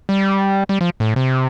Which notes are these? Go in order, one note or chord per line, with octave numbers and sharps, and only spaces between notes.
G3
G3
F3
A2
C3